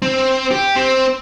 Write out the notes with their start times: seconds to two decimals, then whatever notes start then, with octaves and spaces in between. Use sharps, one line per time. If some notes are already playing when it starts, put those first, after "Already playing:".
0.02 C4
0.51 G4
0.76 C4